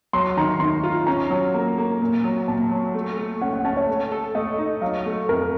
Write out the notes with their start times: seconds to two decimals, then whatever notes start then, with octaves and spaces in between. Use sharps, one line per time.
0.13 F#3 C6
0.37 D#3 A#5
0.60 D#3 C6
0.84 F4
1.07 C#4 A#5
1.30 F#3
1.54 A#3
1.78 A#3
2.01 A#2
2.24 F#3
2.48 A#2 A5
2.71 F#3
2.94 A3
3.18 A3
3.41 C#4 F#5
3.53 F#5
3.65 C#4 A5
3.77 C#5
3.89 A3
4.12 A4
4.35 A3 D#5
4.58 D#4
4.81 F#3 F5
5.06 A3
5.29 F2 A#4